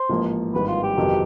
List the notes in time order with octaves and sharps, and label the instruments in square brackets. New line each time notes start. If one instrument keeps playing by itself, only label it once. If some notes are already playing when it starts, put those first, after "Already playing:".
Already playing: [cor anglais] C5
[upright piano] A1 G#2 F3 A#3
[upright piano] G#1 G2 E3 [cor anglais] B4
[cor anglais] F4
G4
[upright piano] G1 F2 C3 D#3 F#3